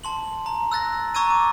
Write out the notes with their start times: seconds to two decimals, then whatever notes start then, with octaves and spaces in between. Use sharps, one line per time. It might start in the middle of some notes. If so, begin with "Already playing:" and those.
0.04 A5 C6 F#7
0.46 A#5
0.72 E6 F#6 A6 A#6
1.15 A#5 C#6 E6 G#6 A6 D#7
1.30 D6